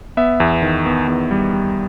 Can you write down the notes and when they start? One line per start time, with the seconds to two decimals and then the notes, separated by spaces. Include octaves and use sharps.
0.17 B3 E5
0.40 E2
0.62 D#3
0.86 B3
1.08 E2
1.31 G3
1.53 G3